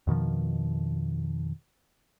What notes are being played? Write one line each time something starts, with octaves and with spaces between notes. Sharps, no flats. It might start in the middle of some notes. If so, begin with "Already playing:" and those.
F2 B2 D#3 F3